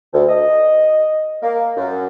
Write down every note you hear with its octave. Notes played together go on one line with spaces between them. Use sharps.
D2
D#5
A#3
F#2